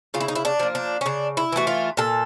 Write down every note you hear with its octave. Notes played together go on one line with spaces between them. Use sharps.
C#3 F4
E4
D#4
E4
D4
F3 A#3
D4
C#4
C#3 D4
E4
E3 A3 F#4
F4
A#2 A4